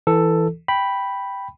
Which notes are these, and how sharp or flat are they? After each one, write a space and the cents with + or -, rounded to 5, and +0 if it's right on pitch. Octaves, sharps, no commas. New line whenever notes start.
E3 +0 A4 +5
G5 +0 B5 +0